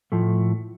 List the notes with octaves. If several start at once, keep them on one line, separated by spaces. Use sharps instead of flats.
A2 F3 A3